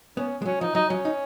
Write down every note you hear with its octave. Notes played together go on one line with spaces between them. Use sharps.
B3 C#4
G#3
F#3 C#4
F3 D#4
F#3 D#4
F#3 C#4
D#4